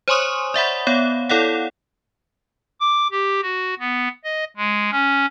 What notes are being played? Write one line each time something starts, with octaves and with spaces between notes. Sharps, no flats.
C5 C#5 G#5 C6 C#6 D#6
D5 E5 F#5 B5
B3 C#5 F5
E4 A4 C#5 D5 F5 F#5
D6
G4
F#4
B3
D#5
G#3
C#4